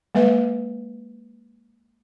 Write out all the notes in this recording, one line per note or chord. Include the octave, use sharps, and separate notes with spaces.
G#3 A#3 B4 E5